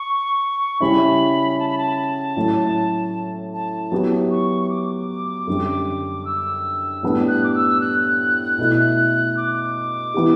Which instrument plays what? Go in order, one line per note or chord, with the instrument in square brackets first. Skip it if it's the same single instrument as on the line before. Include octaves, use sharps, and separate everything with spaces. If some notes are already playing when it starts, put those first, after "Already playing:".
Already playing: [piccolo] C#6
[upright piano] C#3 G3 C#4 E4 [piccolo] B5
[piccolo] A5
B5
A5
[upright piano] A2 F#3 A3
[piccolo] A5
[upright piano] F#3 B3 E4 G4
[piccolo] C#6
C#6
D6
[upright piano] F#2 D3 G3
[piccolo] E6
[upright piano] A2 G3 B3 D4 G4
[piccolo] F#6
D6
E6
F#6
[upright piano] B2 A3 E4
[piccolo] D6
[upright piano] E3 B3 E4 G4